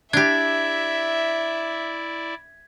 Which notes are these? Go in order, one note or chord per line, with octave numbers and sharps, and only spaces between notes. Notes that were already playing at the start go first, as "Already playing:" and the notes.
D4 E4 G4 D5 E5 G#6 B6